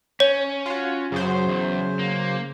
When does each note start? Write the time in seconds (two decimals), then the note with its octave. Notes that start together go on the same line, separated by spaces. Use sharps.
0.20 C#4 C#5
0.66 F4 F#4
1.12 F#2 C#3 F#3 C5
1.48 E2
1.99 A#3